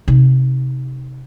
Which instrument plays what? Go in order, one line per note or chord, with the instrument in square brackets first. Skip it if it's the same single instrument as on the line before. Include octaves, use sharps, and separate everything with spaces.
[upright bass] C3 D#4